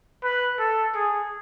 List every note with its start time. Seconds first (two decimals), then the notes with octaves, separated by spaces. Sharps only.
0.24 B4
0.59 A4
0.95 G#4